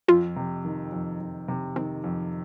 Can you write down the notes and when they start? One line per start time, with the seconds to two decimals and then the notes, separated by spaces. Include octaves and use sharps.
0.08 F2 F4
0.36 C3
0.65 D#3
0.92 F2
1.20 F2
1.48 C3
1.76 D#3 C4
2.04 F2